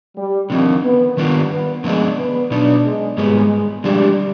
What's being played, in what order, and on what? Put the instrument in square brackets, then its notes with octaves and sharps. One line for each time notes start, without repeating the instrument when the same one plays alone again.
[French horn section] G3
[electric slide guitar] D3 F3 C4 [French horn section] D#3
[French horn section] B3
[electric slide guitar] D#3 G3 D4 F4 [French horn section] B3
[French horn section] B3
[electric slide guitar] D3 F3 B3 D4 [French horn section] G#3
[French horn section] B3
[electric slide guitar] B2 B3 D#4 [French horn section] D4
[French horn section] G#3
[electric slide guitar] G#2 G3 B3 [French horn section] G#3
[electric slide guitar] D3 F3 G#3 D4 [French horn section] G3